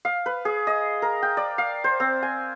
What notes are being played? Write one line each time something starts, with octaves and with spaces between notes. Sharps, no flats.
F5
B4
G#4
D#5
A#4
G5
D5
F5
C5
C4
G#5